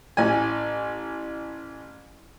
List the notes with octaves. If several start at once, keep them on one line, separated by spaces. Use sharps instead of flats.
A1 G#5